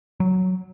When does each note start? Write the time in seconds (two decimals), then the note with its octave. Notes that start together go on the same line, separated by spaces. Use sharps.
0.20 F#3